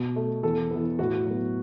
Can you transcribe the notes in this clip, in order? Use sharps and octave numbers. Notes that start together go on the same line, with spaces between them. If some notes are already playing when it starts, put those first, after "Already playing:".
Already playing: B2
A3
E2 A4
E3 B3
A2 F#4
F#3 B3